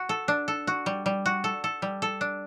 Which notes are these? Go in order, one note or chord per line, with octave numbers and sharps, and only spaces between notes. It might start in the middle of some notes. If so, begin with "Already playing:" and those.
Already playing: F#4
A4
D4
A4
F#4
G3
G3
F#4
A4
A4
G3
A4
D4